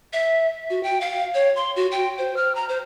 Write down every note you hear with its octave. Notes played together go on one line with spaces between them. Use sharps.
E5
F#4
G5
F5
C#5
C6
F#4
G5
C5
F6
A#5
C5